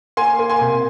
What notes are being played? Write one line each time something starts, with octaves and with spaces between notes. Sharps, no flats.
A#3 G#5 C6
A#3
G#5 C6
C3